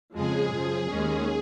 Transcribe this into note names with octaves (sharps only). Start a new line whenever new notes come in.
F2 C#3 F3 G#3 G#4
F#2 C#3 F3
D#2 D#3 G#3 C#4 G#4